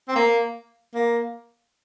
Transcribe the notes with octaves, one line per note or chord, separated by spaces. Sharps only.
C4
A#3
A#3